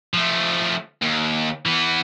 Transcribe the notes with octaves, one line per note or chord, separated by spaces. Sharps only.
F3 A3
D#2
E3 B3